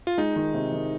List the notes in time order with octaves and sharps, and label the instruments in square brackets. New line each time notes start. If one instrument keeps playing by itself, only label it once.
[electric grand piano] F4
[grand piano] G#3 [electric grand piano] D#4
[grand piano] D#3
C3
D#3